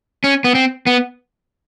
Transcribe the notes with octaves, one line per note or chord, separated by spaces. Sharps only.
C#4
B3
C4
B3